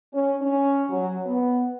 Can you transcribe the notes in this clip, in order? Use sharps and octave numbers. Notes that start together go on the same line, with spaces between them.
C#4
C#4
F#3
B3